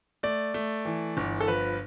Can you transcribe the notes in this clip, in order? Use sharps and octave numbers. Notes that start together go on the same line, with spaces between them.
A3 D5
A3
E3
G1
A4
F3 B4